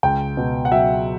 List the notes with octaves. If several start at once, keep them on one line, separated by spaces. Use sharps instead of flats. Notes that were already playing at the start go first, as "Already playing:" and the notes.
C#2 G5
B2
F#5
F#3 E5